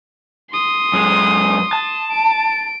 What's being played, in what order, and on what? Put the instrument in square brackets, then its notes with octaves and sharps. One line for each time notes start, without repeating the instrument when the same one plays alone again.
[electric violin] C6 D#6
[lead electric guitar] F#2 G#3
A5
[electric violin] D7